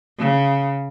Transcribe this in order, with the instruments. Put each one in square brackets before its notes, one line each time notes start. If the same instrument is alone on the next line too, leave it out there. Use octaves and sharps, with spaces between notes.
[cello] C#3